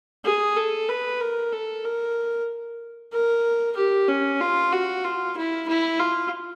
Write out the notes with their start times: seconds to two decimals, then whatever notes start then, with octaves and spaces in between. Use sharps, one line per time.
0.25 G#4
0.57 A4
0.89 B4
1.20 A#4
1.52 A4
1.84 A#4
3.13 A#4
3.76 G4
4.08 C#4
4.41 F4
4.73 F#4
5.04 F4
5.37 E4
5.68 E4
6.00 F4